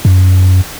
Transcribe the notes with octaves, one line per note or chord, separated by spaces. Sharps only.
F#2